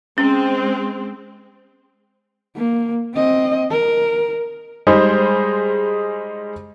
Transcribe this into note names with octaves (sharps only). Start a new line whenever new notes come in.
G#3 C4 C#4
A#3
C4 D#5
A#4
G3 G#3 D#4 G#4 C5